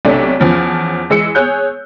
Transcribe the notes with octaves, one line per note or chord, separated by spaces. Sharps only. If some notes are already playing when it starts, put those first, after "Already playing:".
B1 C3 A3 D4 C#5
E2 F3 C#4
E3 G#3 E6 C#7
G#4 C#5 F#6 G6